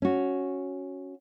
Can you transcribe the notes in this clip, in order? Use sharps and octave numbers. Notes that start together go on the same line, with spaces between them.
C#4 F#4